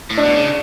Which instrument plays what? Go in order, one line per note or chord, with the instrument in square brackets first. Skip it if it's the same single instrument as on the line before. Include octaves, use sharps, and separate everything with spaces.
[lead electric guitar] A2
[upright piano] D4
[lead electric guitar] B2
C#3